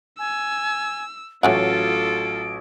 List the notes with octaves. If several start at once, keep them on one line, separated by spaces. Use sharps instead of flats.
G#5 E6
A1 F#3 A3 C#4 F4 F#4 A4 D7